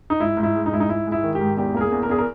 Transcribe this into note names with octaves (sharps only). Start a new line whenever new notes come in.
D#4
G#2 E4
G#2
E4
G#3
D#4
G#2 E4
D#4
G#2 E4
G#3
E4
D#3
G4
G#2
E2 G4
A#3 A#4
G#4
E2
A#4
E2 G#4
A#4